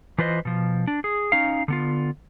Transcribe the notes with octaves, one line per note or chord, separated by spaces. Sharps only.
E3 F4 B4 C5 D#5
B2 F3
D4
G#4
C#4 D#4 F5
D3 B3 F4